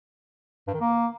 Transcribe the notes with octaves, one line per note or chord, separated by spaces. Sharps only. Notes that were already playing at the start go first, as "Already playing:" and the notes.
G2
D#3
A#3